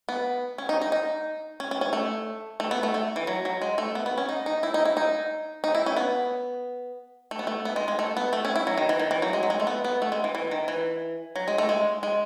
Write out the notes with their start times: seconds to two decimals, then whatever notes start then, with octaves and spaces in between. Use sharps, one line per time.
0.09 B3
0.58 C#4
0.69 D#4
0.81 D#4
0.92 D#4
1.60 C#4
1.71 C#4
1.81 C#4
1.93 A3
2.60 A3
2.71 B3
2.83 A3
2.94 A3
3.16 E3
3.27 F#3
3.45 F#3
3.62 G#3
3.78 A3
3.95 B3
4.06 B3
4.18 C#4
4.29 D#4
4.46 D#4
4.63 E4
4.74 D#4
4.85 E4
4.97 D#4
5.64 D#4
5.75 E4
5.86 C#4
5.97 B3
7.31 A3
7.39 B3
7.47 A3
7.65 B3
7.76 G#3
7.88 G#3
7.99 A3
8.17 B3
8.33 A3
8.45 C#4
8.56 E4
8.67 F#3
8.77 D#3
8.89 E3
9.00 D#3
9.11 E3
9.22 F#3
9.33 G#3
9.43 F#3
9.50 G#3
9.60 A3
9.67 B3
9.84 B3
10.02 A3
10.12 G#3
10.24 E3
10.35 E3
10.51 D#3
10.68 E3
11.36 F#3
11.48 G#3
11.58 A3
11.69 G#3
12.03 G#3